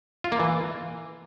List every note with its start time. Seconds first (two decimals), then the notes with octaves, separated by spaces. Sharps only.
0.24 F4
0.32 A#3
0.39 E3